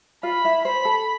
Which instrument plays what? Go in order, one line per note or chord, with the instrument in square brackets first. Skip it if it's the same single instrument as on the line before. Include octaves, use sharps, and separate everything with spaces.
[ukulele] F4 F5 [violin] B5
[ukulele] E4 E5
[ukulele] C5 [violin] B5
[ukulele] A4